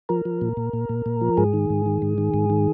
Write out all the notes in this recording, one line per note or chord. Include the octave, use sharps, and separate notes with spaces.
F3 A#4
F3
A#2
A#2
A#2
A#2
A#2
F3
G#2 G#4
D#3
G#2
D#3
G#2
D#3
G#2
D#3